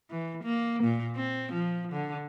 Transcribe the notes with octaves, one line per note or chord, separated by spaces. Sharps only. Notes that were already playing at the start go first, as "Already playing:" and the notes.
E3
A#3
A#2
C4
F3
D3